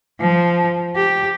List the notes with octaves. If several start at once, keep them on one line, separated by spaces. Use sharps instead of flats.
F3
G4